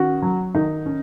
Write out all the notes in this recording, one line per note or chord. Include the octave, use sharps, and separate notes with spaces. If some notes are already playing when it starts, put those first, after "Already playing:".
Already playing: D#3 C#4 F#4
F#3
D#3 D#4
C#4